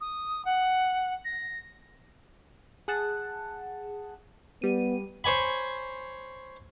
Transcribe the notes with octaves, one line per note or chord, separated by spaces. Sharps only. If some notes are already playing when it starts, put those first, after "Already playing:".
D#6
F#5
A#6
G#4 F#5 A5
G3 B3 D#7
C5 C#5 G#5 B5